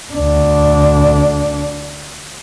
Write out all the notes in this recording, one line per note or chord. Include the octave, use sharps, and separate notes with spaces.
D2 D4